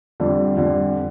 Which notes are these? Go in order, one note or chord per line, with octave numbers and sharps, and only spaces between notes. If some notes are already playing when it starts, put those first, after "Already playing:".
F2 D3 G3
F2 D3 G3